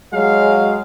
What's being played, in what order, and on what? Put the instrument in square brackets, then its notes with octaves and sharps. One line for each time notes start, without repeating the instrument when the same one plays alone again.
[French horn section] F#3 G#3 [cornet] F5